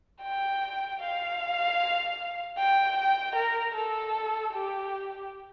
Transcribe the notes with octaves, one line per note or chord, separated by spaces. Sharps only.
G5
F5
G5
G5
A#4
A4
G4